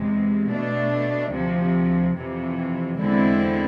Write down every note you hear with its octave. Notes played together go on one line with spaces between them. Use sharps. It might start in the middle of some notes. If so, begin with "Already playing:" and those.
Already playing: E2 C3 G#3
B2 A3 D4
D2 C3 F3
F2 C3 E3
E2 D3 G#3 C4 E4